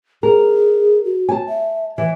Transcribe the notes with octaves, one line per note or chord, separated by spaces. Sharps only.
G#4 A#4
F#4
G#5 A5
E5
E3 E5